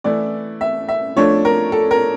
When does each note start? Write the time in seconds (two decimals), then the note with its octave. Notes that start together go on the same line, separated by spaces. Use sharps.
0.04 E3 A3 E4 D5
0.61 E5
0.88 E5
1.16 F3 A3 D4 C#5
1.45 A#4
1.72 A4
1.91 A#4